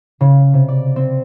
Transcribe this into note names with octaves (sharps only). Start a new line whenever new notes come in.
C#3
C3
D5
C4